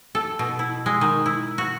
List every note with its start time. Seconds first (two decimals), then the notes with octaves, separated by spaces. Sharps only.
0.15 A4
0.39 B2
0.59 E4
0.86 G#3
1.01 D#3
1.26 E4
1.58 F#4